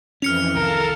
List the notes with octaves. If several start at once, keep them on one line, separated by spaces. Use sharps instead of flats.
F2 E3 C#4 F6 C#7 F7
C2 D#3 A4 A#4 F5 A5